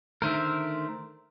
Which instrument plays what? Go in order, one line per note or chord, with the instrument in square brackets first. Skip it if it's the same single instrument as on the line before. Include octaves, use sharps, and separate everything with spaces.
[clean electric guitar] D3 D#3 A3 [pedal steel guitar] A#4 C5 E5